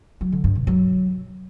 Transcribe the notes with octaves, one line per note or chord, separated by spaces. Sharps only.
F#3
D3
G2
B2
F#3